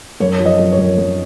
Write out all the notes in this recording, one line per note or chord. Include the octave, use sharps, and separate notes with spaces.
F#2 C#5
F3
D#5
F#2
C#5
F#2
F#2